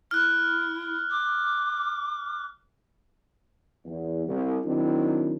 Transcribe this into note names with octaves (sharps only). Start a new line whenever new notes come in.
E4 F6 F#6
D6
E2
C2
D#3 F#3 C4 D4 E4